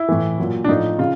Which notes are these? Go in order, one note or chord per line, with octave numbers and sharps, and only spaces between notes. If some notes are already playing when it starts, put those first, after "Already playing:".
Already playing: E4
A2 E3
A#2 F#3
D4
A2 F3 D#4
C#3 F4